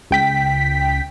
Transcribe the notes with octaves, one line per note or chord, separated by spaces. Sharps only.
C#2 G5 B6